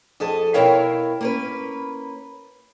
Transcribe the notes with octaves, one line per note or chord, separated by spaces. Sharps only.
F2 G#4 A4 D#5 A5
B2 C4 E4 A#4 C#5 F5
A#3 C#4 B4